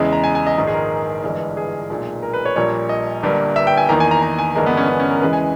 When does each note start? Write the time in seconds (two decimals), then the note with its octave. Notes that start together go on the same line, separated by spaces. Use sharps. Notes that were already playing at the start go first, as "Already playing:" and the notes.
Already playing: E2 C#3 G#3
0.13 A#5
0.24 G#5
0.35 G#5
0.47 D#5
0.57 A#1 G#2 D#3 G#3
0.67 G#4
0.74 A#4
1.23 G1 G2 E3 G#3
1.57 G#4
1.90 B1 A#2 G#3
2.23 A#4
2.34 B4
2.45 C#5
2.56 A#1 A#2 G3 A#3 C#5
2.89 D#5
3.22 G1 G2 G3 A#3
3.56 E5
3.67 G5
3.77 G#5
3.89 E2 D#3 A#3 A#5
4.00 G#5
4.11 A#5
4.22 A#5
4.39 G#5
4.55 G1 G2 E3 G#3 A#4
4.66 B3
4.77 C#4
4.89 C#4
5.00 C#4
5.11 A#4
5.21 E2 C#3 E3 G#3 B4
5.33 G#5